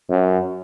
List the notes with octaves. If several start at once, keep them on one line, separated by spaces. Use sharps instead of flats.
F#2